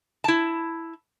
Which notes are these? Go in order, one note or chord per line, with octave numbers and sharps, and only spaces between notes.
E4 A5